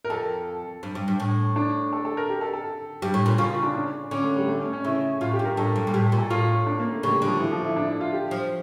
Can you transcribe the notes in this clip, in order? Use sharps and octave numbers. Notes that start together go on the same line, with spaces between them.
A#4
F2 A4
G2
G2
G2
A2
D4
A4
A4
A#4
G4
A4
A4
G2 G4
A2
A#2
C#3 F4
F4
D4
D4
D3 C#4
A3
G3
A3
C#4
C#4
C#3 E4
A2 F4
G4
G2
A#4
A2 A4
G2
A#2
A2 G4
A4
A#2
A4
A2 F4
D4
A#3
A3
C#3 G3
G3
D3
F3
E3
F3
E4
D4
E4
F4
G4
F3